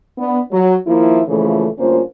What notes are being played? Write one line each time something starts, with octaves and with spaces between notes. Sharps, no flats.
B3 D4
F#3
D#2 F3 A#3 E4
A#2 C#3 E3 F3 A3
D2 G2 A#3 C#4 F4 C5